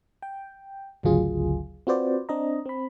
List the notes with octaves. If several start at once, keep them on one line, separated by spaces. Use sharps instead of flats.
G5
G#1 D2 C#3 F#3 F4 G#4
C4 F4 F#4 B4 C5 D5
C4 D4 D#5 A#5
C4 B5